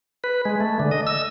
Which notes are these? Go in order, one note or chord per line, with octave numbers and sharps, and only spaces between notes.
B4
G#3
A3
D3
D#5
E6